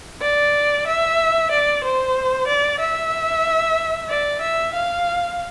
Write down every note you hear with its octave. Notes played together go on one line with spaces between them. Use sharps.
D5
E5
D5
C5
D5
E5
D5
E5
F5